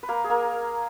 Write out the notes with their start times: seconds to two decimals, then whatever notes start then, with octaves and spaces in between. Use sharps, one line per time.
0.03 B4
0.09 A#3 A#4
0.24 G#4
0.29 A#3 A#4